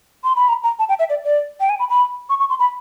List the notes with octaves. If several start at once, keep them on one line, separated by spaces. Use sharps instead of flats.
C6
B5
A#5
A#5
A5
G5
E5
D5
D5
G5
G#5
B5
B5
C#6
C#6
C6
B5